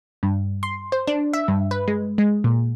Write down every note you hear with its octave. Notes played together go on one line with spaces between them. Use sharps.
G2
C6
C5
D4
E5
G2
B4
G#3
G#3
A#2